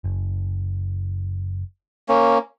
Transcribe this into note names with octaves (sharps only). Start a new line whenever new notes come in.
F#1
A#3 C#4